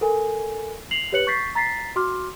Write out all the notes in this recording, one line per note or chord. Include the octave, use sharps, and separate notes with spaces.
A4 A#4 G#5
C7 F7 F#7
G4 B4 C#5 F#6 C#7 F#7
C#6 G6 A6 B6 C7
A#5 A6 B6 C7
F#4 C6 D6 F6